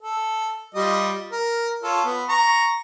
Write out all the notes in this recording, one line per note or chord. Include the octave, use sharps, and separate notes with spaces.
A4
G3 F4 D#5
A#4
F4 A4 C#5
B3
A#5 C#6